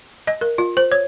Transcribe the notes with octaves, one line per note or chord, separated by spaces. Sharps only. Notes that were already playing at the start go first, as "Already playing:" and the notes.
D#5
A#4
F4
C5
C#5